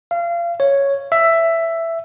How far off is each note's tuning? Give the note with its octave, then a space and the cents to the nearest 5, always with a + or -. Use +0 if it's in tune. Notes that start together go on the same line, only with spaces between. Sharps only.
F5 -30
C#5 +0
E5 +10